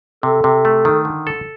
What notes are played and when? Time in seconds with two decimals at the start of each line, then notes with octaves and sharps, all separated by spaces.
0.23 C3 A4
0.44 C3
0.65 A3
0.85 D#3
1.05 D3
1.27 A4